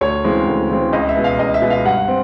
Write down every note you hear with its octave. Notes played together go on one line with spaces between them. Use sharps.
D2 C#5
C#3 E3 G#3 C4
D2
C#3 E3 G#3 C4
C#2 D#5
E5
B2 G#3 B3
F5
C#2 D#5
E5
B2 G#3 B3
F5
G2 F#5
C4